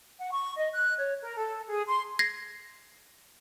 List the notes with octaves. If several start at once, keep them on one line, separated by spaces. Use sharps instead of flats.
F#5
C#6
D#5
F#6
C#5
A#4
A4
G#4
C6
G#6 A#6 C7